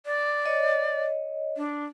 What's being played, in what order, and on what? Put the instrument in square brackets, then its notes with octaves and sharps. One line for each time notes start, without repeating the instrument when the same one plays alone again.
[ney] D5
[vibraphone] C#5 D#5
[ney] D4